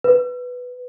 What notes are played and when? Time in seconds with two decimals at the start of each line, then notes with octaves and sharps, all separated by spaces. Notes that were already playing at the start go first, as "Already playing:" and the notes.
0.04 B4